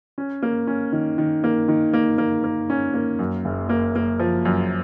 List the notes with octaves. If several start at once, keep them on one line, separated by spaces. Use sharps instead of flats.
C#4
A#3
C#4
D#3
D#3
A#3
D#3
A#3
A#3
A#3
C#4
A#3
F#2
F#1
A#3
A#3
F3
F#2